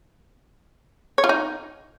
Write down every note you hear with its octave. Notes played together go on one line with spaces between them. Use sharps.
C#5
F4
D#4